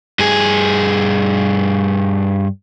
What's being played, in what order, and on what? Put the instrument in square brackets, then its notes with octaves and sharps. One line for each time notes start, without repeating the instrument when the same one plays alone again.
[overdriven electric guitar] G2 G#4